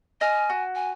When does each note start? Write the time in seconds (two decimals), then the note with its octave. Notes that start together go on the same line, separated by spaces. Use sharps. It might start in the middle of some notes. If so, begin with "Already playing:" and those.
0.21 D#5 G#5 F6
0.50 F#4
0.75 G#5